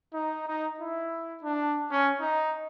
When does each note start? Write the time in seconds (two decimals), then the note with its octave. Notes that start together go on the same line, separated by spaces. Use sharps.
0.14 D#4
0.47 D#4
0.80 E4
1.43 D4
1.92 C#4
2.21 D#4